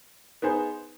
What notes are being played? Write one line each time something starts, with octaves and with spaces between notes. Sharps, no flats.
B3 D#4 G#4 C5